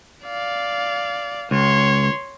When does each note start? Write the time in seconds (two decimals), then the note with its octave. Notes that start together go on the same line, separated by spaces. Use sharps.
0.25 D5 F5
1.51 C#2 C#5 C6